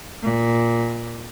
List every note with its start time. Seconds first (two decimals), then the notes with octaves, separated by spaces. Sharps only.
0.23 A#2